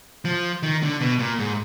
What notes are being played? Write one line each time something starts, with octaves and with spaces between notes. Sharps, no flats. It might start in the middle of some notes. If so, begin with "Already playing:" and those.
F3
D#3
D3
B2
A#2
G#2